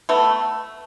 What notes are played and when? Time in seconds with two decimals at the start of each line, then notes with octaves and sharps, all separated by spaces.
0.09 A3 B3